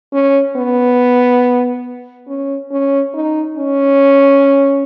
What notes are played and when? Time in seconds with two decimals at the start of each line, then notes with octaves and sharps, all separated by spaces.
0.13 C#4
0.57 B3
2.28 C#4
2.71 C#4
3.14 D#4
3.57 C#4